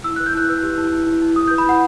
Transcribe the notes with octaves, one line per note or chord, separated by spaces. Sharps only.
E4 E6
F#6
B4
G6
E4 F#6
B4 E6
G4
E4
E4
E4
E4
E4 D#6
G6
B4
B5
E4 F#5